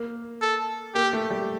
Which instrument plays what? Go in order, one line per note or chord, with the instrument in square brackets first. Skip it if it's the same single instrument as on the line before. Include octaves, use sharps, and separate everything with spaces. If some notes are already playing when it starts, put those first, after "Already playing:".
Already playing: [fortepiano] A#3
[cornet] A4
[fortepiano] A#3 [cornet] G4
[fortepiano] A3
G3